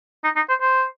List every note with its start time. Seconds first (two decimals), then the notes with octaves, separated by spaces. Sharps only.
0.24 D#4
0.36 D#4
0.49 C5
0.61 C5